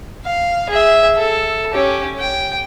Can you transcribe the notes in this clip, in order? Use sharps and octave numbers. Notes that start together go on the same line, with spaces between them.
F5
G#4 E5
A4
C#4 G4
G5